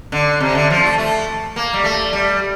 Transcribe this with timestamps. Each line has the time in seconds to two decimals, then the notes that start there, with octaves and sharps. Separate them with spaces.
0.12 D3
0.40 C3
0.55 D3
0.70 F3
0.84 A3
0.98 A3
1.56 A#3
1.73 G3
1.84 A3
2.13 G3